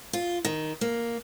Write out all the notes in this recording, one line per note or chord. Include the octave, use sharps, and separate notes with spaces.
F4
D#3
A#3